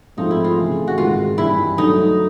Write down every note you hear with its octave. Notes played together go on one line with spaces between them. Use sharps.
G#2 F3 A3 C4 D#4 F4
E4
F4
C#3 E3 A3
F#4
G#2 D#3 G#3 C4 F4
G2 E3 G3 E4
D3 F#3 A3 D#4